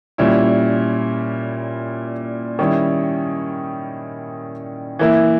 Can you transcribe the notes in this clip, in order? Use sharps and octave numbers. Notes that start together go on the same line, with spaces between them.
A#2 G3 C#4 E4
D#3 G3 C#4 E4
E3 A#3 E4